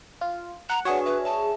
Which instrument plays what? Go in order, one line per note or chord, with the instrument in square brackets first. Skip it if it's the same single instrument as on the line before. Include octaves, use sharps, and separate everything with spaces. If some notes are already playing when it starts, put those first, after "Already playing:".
[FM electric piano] F4
[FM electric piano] F#5 [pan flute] A#5
[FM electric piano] D4 G#4 C#5 [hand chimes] F#4 B4 [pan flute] F#5
[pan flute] B4 [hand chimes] E5
[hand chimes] E5 [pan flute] A5